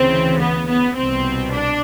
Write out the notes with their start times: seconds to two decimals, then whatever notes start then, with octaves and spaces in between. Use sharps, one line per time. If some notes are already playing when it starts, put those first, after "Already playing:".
Already playing: D2 C#3 E3 C4
0.41 B3
0.69 B3
0.97 C2 B2 C4
1.53 D4